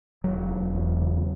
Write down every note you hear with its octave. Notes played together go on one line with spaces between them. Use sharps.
E1 F#3
E1
E2
C#3